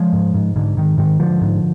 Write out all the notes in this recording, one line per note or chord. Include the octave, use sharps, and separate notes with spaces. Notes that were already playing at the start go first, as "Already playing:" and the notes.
Already playing: F3 G#3
G#2
G#2
G#2 D3
G#2 D#3
G#2 D#3
G#2 D3 F3
G#2